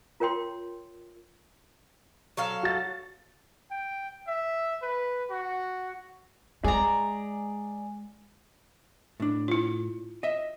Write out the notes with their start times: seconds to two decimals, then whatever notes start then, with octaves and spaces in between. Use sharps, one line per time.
0.20 F4 A#4 C#5 G5 C6
2.37 F#3 A4 F5
2.63 F#4 A6
3.71 G5
4.27 E5
4.82 B4
5.30 F#4
6.64 G#3 G#4 D5 A#5
9.20 A2 D4
9.48 E4 F4
10.23 D#5 E5